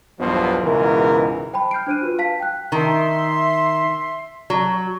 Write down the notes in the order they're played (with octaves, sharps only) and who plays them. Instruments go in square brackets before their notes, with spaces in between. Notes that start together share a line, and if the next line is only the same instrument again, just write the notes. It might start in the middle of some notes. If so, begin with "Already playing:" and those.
[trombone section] B1 E2 G2 B2 F3 C5
C#2 G#2 B2 E3 A#4
[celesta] C5 G5 A5 B5
F6 G6 C7 D7
D4 C5 F#6 D#7
F4 F#4 B4
F5 A5 B6
G5 F#6
[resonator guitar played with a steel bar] D#3 [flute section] E5 C6
[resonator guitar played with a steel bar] F#3